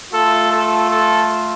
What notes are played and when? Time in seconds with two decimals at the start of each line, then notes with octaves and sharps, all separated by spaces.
0.12 A3 F4 A4
0.51 A4
0.90 A4